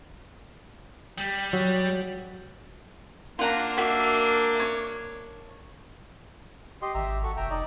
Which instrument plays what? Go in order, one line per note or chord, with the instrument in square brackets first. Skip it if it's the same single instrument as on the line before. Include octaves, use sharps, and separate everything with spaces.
[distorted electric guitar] G3
[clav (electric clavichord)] F#3
[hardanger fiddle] A#3 D4 [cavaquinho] F4 F#5 A#5
[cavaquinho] F#4 E5 F5
C#5
[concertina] G4 D#5 C6
[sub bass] G#1 [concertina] G4 E5 A#5
[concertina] F#4 A4 C#6
[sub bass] F1 [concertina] E5 G5 A#5
[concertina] D#4 D5 D#5